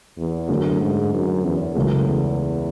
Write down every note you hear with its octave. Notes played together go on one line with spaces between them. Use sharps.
E2
F#2 D3 A3 C#4
G#2
F#2
E2
C#2 F#2 C#3 E3 A3
E2